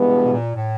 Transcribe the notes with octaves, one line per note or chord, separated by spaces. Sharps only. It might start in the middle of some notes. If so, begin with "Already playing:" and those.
Already playing: G2 E3 G#3 B3
B2
B2
A#2
A2